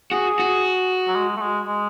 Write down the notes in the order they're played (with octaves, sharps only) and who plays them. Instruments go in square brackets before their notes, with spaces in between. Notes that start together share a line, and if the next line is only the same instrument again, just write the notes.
[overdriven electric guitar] F#4 [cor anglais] G#4
[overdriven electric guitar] F#4
[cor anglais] F#3
G#3
A3
G#3
G#3